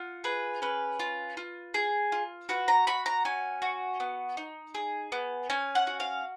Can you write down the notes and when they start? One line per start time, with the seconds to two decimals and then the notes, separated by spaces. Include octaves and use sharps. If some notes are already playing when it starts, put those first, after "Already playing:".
Already playing: F4 F#5
0.24 G#4 B4
0.62 C#4 B4
0.99 F4
1.37 F4
1.74 G#4
2.12 F4
2.49 F#4 B4
2.68 A#5
2.87 F#4 B5
3.06 A#5
3.25 C#4 G#5
3.62 F#4
4.00 B3
4.37 D#4
4.75 G#4
5.12 B3
5.50 C#4 G#5
5.75 F#5
5.87 F#4
6.00 F5